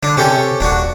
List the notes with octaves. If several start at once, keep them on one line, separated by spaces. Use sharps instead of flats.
D3 D4
C3 C#4 G4 A4
D#1 D4 F#4